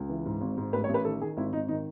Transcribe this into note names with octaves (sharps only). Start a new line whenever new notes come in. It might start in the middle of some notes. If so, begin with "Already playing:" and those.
Already playing: C#2
E3
G#2
G#1
G#2
A1 B4
C#5
A1
B4
D#3 A4
D#3 G#4
G#1 E4
G#1 D#4
D#3 D#4